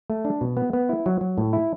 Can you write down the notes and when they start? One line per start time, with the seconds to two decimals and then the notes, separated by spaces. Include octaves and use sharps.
0.10 A3
0.25 D4
0.41 B2
0.57 B3
0.73 B3
0.89 E4
1.06 F#3
1.21 F#3
1.38 A2
1.53 E4